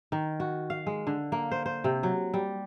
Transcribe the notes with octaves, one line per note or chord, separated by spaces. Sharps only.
D#3
F#4
F5
G#3
D3
A#3
C5
C5
C3
F#3
G3